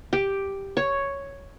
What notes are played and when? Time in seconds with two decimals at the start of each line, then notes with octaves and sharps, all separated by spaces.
0.13 G4
0.77 C#5